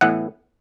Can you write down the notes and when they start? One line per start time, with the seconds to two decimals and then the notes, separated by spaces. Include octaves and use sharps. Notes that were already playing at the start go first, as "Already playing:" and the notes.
0.01 A2 E3 B3 E4 F#5